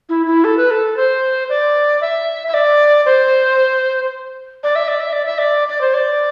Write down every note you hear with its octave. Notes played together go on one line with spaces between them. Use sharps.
E4
E4
A4
B4
A4
C5
D5
E5
E5
D5
C5
D5
E5
D5
E5
D5
E5
D5
D5
C5
D5